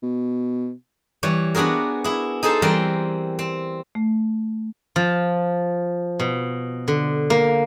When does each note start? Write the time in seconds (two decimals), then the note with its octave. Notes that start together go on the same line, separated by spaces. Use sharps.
0.03 B2
1.23 E3 G3 C#5
1.55 B3 D4 F#4 G#4 A#4
2.04 E4 G#4
2.43 D#4 G#4 A4 C5 A5
2.62 E3 G3 C4 A#4 G5
3.39 C4
3.95 A3
4.96 F3
6.20 B2
6.88 D3
7.30 A#3